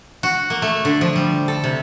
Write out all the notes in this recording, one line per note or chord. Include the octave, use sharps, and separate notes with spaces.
F#4
A#3
A3
D3
F3
G3
A4
C3